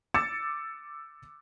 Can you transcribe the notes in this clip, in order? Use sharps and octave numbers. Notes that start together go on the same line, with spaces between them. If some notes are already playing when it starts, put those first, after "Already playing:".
D6 E6 A6 C#7 E7